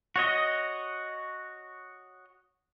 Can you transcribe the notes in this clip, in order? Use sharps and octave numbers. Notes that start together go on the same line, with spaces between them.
F#4 C#5 D#5